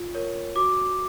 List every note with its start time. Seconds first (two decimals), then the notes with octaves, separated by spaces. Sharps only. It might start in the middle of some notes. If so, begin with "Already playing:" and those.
Already playing: F4
0.15 A#4 C#5
0.55 F#4 D6